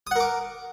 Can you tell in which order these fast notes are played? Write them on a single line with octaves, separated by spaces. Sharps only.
D#6 F#5 A#4 D6